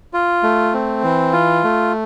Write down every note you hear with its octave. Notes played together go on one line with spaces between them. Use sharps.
F4
A3
C4
E3
F4
A3